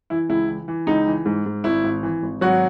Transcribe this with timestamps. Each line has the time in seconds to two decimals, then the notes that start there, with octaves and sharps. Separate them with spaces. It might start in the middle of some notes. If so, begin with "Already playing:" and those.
0.10 E3 E4
0.29 C#2 E4
0.49 E3
0.68 E3
0.87 C#2 D#4
1.07 E3
1.26 G#2
1.46 G#2
1.64 G#1 E4
1.84 G#1
2.03 E3
2.23 G#1
2.41 G#1 F#3 F#4